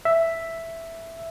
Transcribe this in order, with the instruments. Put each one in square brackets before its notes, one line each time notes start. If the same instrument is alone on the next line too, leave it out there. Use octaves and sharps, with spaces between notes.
[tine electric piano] E5